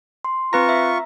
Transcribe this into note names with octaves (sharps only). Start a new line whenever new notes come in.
C6
C4 F4 B4 A#5 C#6 A#6
E5